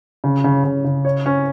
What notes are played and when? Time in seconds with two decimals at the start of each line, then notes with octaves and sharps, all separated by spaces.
0.24 C#3
0.44 C#3
0.64 C#3
0.85 C#3
1.05 C#5
1.26 C#4